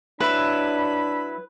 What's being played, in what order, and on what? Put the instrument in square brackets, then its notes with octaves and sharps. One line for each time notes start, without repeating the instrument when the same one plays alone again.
[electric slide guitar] F#3 E4 E5 [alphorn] D4 [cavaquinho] B4 [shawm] B5